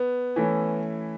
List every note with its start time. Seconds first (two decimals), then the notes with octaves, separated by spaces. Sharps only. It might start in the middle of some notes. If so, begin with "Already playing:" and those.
Already playing: B3
0.36 E3 A3 C#4 E4